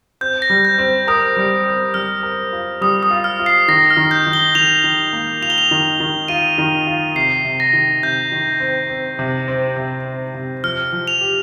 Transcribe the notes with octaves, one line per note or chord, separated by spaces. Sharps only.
C4 G6
A#6
G3
G6
C4
A#4 D#6
G3
C4
G3 F6
A#4
F4
G3 D#6
D#6
F4
F6
F4
C7
D#3 A#6
F6
D#3
G6
D#3
G7
D#3 F7
D#3
A#3
F4 F7
G7
F7
D#3
D#3
F4 D#7
D#3
F4
C3 C7
C3
A#6
D#3
C3 G6
D#3
C4
C4
C3
C4
C3
C4
C3
F3 F6
F3
F7
G4